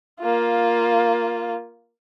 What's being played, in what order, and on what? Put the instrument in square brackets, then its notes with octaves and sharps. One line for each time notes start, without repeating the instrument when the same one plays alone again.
[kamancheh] A#3 F4